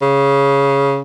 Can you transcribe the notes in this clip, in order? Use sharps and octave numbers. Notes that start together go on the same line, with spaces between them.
C#3